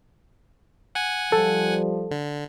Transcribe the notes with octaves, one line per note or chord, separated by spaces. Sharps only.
F#5 G#5
F3 G3 A4
D3